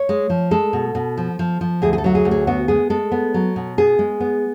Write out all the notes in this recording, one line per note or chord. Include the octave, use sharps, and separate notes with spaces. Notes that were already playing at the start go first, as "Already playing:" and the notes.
Already playing: C#5
G#3
F3
G#3 A4
B2
B2
F3
F3
F3
D2 G#4
G#4
A4
F#3 F#4
G#4
D2
G#4
B3 F#4
G#3 G#4
G#3 A4
B3
F#3
B2
B3 G#4
G#3
B3